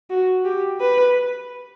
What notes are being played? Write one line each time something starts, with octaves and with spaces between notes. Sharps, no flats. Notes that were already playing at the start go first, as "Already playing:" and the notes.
F#4
G4
B4